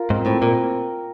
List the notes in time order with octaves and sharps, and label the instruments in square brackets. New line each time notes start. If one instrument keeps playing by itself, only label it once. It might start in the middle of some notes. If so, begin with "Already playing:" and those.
Already playing: [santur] F4 A#4
[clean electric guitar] G#2 [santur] C4
[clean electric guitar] A2 [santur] C4
[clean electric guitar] A#2 [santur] A#4